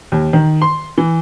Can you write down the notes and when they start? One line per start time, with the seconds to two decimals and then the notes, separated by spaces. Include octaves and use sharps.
0.12 D#2
0.33 D#3
0.62 C6
0.98 E3